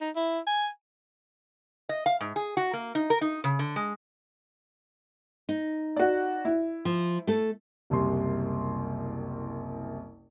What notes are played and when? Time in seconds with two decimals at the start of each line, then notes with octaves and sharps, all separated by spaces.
0.01 D#4
0.16 E4
0.47 G#5
1.89 D#5
2.06 F5
2.21 G#2
2.36 G#4
2.57 F#4
2.73 A#3
2.95 D#4
3.10 A#4
3.21 D#4
3.44 C#3
3.59 D3
3.76 G#3
5.49 D#4
5.96 F#4 D5
6.45 E4
6.85 F3
7.27 A3 A4
7.90 F#1 C2 C3 C6